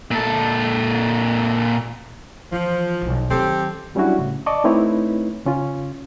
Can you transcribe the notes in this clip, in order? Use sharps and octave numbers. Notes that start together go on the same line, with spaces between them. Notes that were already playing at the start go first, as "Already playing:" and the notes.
A#2 A4
E3 F3
E1 B1
D#3 F#3 C4 G4 A4
F#3 G3 C#4 D4 E4 F#4
A2 C#3
D5 D#5 A5 C#6 D6
A3 C4 D#4 E4 B4 C#5
C#3 C#4 F4